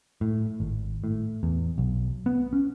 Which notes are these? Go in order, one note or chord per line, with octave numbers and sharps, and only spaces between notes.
A2
G#1
A2
E2
B1
B3
C#4